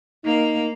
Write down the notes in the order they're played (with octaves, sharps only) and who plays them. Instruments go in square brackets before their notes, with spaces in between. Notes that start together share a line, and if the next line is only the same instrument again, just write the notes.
[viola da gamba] A#3 [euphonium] D#4